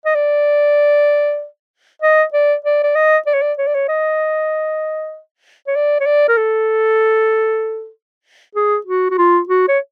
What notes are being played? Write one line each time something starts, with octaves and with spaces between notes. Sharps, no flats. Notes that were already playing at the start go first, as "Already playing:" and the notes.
D#5
D5
D#5
D5
D5
D5
D#5
D5
C#5
D5
C#5
D5
C#5
D#5
C#5
D5
C#5
D5
A#4
A4
G#4
F#4
F#4
F4
F#4
C#5